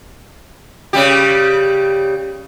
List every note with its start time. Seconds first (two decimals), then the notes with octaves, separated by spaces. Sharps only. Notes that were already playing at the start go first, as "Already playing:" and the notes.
0.93 C#3 G3 G4